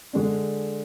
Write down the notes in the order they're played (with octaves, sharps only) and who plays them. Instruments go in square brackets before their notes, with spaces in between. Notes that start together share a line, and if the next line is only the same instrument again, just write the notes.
[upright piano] D3 G#3 D4